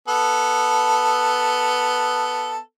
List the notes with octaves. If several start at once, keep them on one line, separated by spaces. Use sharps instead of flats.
B3 A4